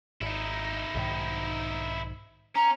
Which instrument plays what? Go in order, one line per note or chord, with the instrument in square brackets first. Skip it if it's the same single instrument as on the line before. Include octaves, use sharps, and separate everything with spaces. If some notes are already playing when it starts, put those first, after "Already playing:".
[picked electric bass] G#1 [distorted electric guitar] D#4 E4
[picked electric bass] B1 G#2 D#3
[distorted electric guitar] C#4 [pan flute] A#5